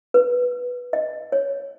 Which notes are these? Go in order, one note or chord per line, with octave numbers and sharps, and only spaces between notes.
B4
D#5
C#5